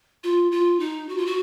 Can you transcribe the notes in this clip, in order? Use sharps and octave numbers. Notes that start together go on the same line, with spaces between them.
F4
F4
D#4
F#4
F4
F#4